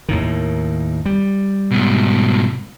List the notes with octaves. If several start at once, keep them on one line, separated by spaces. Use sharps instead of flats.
D#2 A2 D#3
G3
G#2 B2